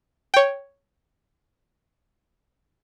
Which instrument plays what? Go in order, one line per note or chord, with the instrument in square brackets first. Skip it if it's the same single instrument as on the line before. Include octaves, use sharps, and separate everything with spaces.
[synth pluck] C#5 G5